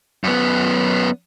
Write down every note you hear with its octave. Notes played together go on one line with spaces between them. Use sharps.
F#2 B3